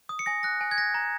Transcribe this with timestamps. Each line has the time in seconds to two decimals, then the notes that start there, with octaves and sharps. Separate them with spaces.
0.09 D#6
0.19 C#7
0.26 G#5 A#6
0.43 F#6 A#6
0.61 G#5
0.71 G#6
0.77 F#6 A#6
0.94 A#5